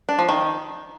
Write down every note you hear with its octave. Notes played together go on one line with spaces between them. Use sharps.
D4
F3
D#3